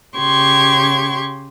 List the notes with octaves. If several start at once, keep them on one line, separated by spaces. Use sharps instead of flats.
C#3 G4 C6 C#6 G#6